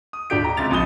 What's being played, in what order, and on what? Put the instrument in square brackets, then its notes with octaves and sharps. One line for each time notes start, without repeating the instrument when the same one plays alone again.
[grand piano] D#6
D#1 D4 G4 G6 D7
A#5
C#2 C3 A6 F7
A#1 D#4 D#6 G7